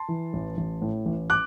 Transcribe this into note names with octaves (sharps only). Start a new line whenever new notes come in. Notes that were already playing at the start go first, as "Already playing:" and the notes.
Already playing: A5 C6
E3
A1
A1
A2
A1
D6 F#6